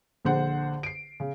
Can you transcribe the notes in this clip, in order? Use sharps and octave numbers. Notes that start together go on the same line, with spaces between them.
A#1 D3 C5 F#5
C7 D7
C#3